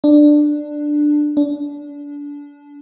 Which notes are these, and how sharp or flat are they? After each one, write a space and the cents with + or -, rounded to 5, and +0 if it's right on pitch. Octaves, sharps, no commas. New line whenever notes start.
D4 +10
D4 -25